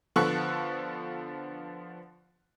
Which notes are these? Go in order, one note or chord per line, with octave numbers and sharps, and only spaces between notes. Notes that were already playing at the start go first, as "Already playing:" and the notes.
D3 F3 B3 A4 C#6 F#6